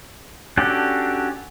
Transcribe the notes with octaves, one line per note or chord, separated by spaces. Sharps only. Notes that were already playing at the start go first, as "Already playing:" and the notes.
C#4 D4 F#4 G4 A4